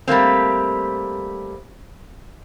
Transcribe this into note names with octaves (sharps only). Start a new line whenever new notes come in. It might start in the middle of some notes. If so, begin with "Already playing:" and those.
G3 A3 A#3 C4